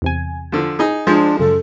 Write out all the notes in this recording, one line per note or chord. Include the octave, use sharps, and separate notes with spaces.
E2 C3 G#5
D3 F3
D#4 G#4
F3 G#3 D4 C5
F#2 C#3 A4